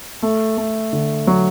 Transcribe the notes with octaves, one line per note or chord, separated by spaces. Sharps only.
A3
A3
D3
F#3